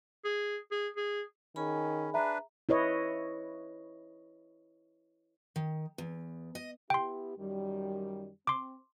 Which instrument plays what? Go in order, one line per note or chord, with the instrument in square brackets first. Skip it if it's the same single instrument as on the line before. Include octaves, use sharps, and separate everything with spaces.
[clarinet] G#4
G#4
G#4
[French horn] D#3 [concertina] C#4 [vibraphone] G#4 G#5 B5
[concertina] D4 B4 [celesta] E5 A#5
[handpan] E4 B4 C#5 D#5
[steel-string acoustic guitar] D#3
E2
D#5
[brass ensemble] B3 E4 G4 [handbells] G5 C6
[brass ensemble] F#2 D#3 G3
[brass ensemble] C4 [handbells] C6 D6